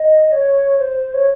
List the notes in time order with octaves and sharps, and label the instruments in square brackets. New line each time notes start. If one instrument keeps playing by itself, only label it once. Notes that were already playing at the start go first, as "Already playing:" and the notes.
Already playing: [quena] D#5
C#5
C5
C#5